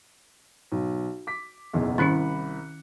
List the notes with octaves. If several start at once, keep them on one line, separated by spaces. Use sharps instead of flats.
B1
D6 B6
F#1 B1 E2
C2 D#3 C#4 E4 B5 F#6 C#7